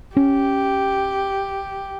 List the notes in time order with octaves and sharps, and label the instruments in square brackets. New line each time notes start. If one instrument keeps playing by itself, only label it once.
[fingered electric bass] C#4 [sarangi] G4